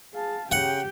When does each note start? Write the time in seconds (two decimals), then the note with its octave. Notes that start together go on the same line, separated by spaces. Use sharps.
0.14 G#4 F5 A5
0.52 C#3 G4 F#5 G5